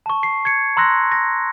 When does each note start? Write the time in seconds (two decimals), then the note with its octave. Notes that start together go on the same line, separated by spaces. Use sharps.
0.06 A5 C#6
0.23 C7
0.45 G#6 C#7
0.77 A#5 C6 E6 F#6 A#6
1.12 A#6